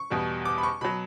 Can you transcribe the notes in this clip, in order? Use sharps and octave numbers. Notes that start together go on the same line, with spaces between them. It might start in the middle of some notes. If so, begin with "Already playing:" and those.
Already playing: C#6
E2 B2 G3
D6
B5
C#6
B2 F#3 B5